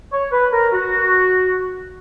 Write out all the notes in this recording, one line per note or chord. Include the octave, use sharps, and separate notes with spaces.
C#5
B4
A#4
F#4